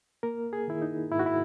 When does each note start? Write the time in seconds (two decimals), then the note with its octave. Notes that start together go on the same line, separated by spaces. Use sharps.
0.23 A#3 A#4
0.53 G#4
0.68 D#3 E4
0.82 D#4
1.11 G#2 E4
1.19 F#4
1.26 E4